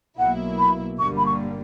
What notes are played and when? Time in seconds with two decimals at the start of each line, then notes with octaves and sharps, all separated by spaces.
0.18 B1 B2 F#3 A#3 E4 F#5
0.58 B5
0.98 G1 G2 D3 G3 A#3 C#6
1.17 B5
1.25 C#6